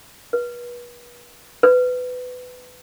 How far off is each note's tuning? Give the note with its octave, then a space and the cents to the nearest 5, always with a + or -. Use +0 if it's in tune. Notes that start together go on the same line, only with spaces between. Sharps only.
B4 -35
B4 +20